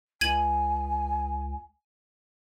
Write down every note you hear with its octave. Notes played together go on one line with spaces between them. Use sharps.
C#2 G#5 G#6 D#7 F#7